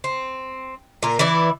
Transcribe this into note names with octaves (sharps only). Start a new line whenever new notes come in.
C4
A#2 A#4
E3 E4 D5